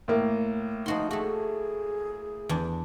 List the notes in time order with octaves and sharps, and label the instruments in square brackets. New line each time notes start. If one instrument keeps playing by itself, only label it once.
[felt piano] A2 A#3
[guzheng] F3 F#4 C6 [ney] D#4
[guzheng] A3 F#4 [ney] G#4
[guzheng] E2 D4